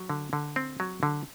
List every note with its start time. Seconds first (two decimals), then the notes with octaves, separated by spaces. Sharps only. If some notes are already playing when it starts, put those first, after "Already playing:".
Already playing: F#3
0.10 D3
0.33 D3
0.56 C4
0.80 F#3
1.03 D3